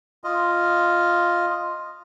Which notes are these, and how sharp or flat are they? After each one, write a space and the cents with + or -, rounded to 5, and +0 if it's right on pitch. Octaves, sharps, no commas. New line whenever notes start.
F4 +0 D#5 +0